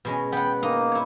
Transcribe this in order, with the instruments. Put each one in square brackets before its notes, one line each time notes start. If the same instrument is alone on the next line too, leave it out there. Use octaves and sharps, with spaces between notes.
[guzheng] B2 G#3 C#4
[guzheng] B3 F#5 [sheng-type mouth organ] G5
[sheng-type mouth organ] A#3 [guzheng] D#4
[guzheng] E4 C#5